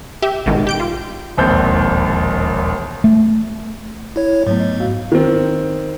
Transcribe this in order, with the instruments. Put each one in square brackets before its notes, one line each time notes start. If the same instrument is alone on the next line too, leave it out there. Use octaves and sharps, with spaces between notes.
[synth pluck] G4 E5
A1 G#2 B2 D#3
G4 G6 D7
F4
[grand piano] E1 A#1 D#2 C4 G6
[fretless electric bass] A3
[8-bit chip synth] E4 C#5
[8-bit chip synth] G#2 [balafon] F#3 A3 B3
[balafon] D#5
F#4 F5
[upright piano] D#3 C4